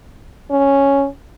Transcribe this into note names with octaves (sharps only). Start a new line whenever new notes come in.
C#4